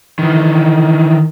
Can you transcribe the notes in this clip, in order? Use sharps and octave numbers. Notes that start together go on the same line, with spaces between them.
D#3 E3